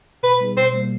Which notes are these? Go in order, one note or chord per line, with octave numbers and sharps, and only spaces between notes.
B2 B4
G3 B3 D#4 G#4
B2 C5
G3 A#3